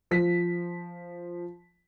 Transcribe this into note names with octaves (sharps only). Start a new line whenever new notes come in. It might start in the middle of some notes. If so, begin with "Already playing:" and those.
F3 B6